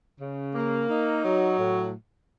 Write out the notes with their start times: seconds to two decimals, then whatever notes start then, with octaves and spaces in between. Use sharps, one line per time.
0.20 C#3
0.54 A#3
0.89 D#4
1.24 F#3
1.59 A2